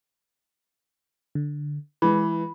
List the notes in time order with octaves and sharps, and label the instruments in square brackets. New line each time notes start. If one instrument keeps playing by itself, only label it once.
[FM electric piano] D3
[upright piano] E3 [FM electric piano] G#3 B4 [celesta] B5